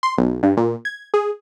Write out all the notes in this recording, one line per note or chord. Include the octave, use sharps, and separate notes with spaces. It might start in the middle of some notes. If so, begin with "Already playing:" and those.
C6
B1
G2
A#2
G#6
G#4